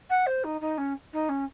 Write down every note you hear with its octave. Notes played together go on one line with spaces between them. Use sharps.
F#5
C5
D#4
D#4
C#4
D#4
C#4